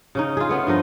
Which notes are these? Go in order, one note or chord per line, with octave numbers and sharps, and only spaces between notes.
C#3 C#4 D#4
F4 G#4
A3 B3 C#4
G2 F3 D#4 D#5